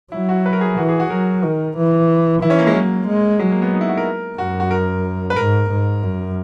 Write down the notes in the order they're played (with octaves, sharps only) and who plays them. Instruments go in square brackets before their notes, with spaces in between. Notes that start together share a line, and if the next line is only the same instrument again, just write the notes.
[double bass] F#3 [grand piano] E4
[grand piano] F#4
B4
A#4
G#4
[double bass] E3 [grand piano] F#4
[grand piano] G#4
F#4
[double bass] F#3 [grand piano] A#4
[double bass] D#3
E3
[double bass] E3 [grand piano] E4
[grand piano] C#4
A#3
G#3
[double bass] F#3 [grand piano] A#3
[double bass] G#3
[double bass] F#3 [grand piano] G#3
[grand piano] A#3
B3
D#4
E4
F#4
A#4
[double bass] F#2 [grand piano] F#4
[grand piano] F#4
A#4
B4
[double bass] G#2 [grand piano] A#4
[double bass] G#2
F#2